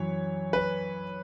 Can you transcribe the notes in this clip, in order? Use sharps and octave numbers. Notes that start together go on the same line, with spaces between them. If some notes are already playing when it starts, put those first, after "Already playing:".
Already playing: F#2 E3 C#5
B4